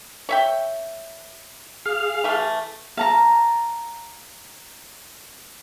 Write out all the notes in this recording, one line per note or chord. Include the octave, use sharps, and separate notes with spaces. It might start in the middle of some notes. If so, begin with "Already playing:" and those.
C#5 E5 G5
G#4 F5 F6
E3 A3
F5 A5 A#5